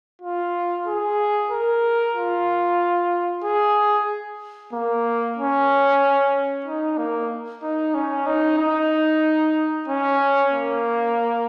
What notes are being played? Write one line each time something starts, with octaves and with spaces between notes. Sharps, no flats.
F4
G#4
A#4
F4
G#4
A#3
C#4
D#4
A#3
D#4
C#4
D#4
D#4
C#4
A#3